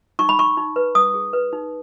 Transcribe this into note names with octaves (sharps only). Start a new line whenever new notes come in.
D#4 C#6
B5
D#4 C#6
D#4
B4
B4 D#6
G#4
B4
D#4